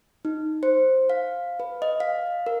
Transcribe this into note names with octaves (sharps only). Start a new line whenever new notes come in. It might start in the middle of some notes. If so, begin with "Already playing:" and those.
D#4
C5
F5
B4
D#5
F5
A#4